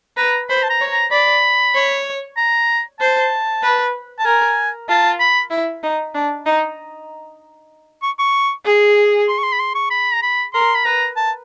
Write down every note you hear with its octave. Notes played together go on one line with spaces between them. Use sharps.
B4 A#5
C5 B5
A5
A#5
C#5
A#5
D5 B5
C#5
A#5
C5 A5
B4
A5
A#4 G#5
F4 A5
B5
E4
D#4
D4
D#4
C#6
C#6
G#4
C6
C#6
C6
B5
C6
C#6
B5
A#5
B5
A#4 C6
B5
B4 A#5
A5